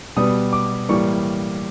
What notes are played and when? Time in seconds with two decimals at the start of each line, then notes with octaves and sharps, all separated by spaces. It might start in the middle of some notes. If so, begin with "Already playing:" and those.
0.16 B2 G3 B3 D#6
0.53 D6
0.89 A2 E3 G3 A#3 C#6